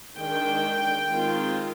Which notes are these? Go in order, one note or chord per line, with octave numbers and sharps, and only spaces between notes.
D#3 G#3 D4 G5
D#3 G#3 C4 F4